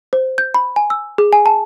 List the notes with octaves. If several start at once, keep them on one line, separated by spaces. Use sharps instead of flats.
C5
G6
B5
G#5
E6
G#4
G#5
A5